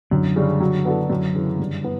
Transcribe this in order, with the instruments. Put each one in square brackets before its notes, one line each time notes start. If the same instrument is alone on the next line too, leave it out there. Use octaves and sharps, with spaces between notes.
[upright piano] F#2 [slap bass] D3
[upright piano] C#3 G3 C#4
F#3
B3 D4 F#4 A4
F#2
C#3 E3
G2
B3